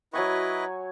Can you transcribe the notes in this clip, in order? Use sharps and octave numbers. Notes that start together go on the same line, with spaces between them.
F#3 E4 B4 D#5 G#5 C#6